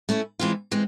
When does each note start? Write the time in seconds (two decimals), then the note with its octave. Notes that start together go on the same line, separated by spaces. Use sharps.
0.09 A3 C#4 E4
0.39 E3 G#3 C4 F4
0.71 E3 G#3 C4